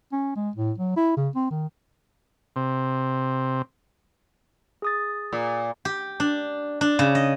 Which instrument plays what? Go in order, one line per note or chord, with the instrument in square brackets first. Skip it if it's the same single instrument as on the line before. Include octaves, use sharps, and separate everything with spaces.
[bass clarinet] C#4
G#3
A2
F#3
E4
C#3
C4
D#3
[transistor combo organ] C3
[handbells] G#4 D#6 A6
[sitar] A#2
[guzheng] G4
D4
D4
C#3
D#5